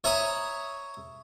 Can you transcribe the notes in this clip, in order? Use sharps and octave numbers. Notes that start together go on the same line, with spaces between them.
C#5 E5 A#5 B5 D#6